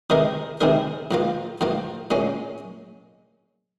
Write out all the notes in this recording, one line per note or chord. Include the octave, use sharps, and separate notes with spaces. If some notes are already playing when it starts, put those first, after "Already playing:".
C3 D#3 G#3 D#4 A#4
C3 D#3 G#3 D#4 A#4
G#2 F3 A#3 F4
G#2 F3 A#3 F4
A#2 G#3 C#4